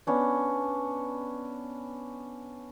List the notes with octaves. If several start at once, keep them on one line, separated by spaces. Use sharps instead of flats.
B3 C#4 D4